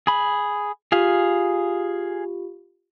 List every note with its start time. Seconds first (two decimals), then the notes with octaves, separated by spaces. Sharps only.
0.07 G#4 B5
0.92 F4 G4 G#4 F5